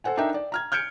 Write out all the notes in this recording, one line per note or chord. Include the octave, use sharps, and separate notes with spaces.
A4 C5 F#5 G#5
D4 D#4 A#4 E5 G5
D5
A#5 F6 G#6
F6 G6 G#6 C#7 D7